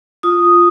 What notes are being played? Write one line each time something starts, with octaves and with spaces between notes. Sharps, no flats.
F4 D#6